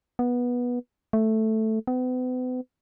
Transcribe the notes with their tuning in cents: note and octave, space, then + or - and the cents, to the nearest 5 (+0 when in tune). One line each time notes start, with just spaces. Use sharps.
B3 -15
A3 +0
B3 +40